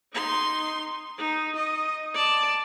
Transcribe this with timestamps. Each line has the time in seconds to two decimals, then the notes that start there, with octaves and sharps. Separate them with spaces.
0.13 D#4 C6
1.18 D#4
1.56 D#5
2.14 D5 A5